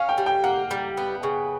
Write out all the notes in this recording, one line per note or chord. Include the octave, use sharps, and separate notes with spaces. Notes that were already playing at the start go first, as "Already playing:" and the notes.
Already playing: C#4 F5
G5
G3
G5
A#3 F#5
G3
B3
C#3